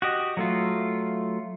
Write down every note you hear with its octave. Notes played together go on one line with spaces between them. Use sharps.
F#4 G4 D#5
F#3 A3 F4